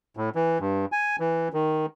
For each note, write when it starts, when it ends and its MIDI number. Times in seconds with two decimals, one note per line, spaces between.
0.17 0.29 45
0.35 0.58 52
0.60 0.85 43
0.92 1.16 80
1.20 1.48 52
1.53 1.86 51